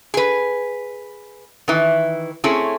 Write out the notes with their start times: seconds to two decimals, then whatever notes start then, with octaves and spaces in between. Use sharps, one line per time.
0.14 G#4 B4
1.68 D#3 E3
2.44 A3 C4 C#4 E4 G#4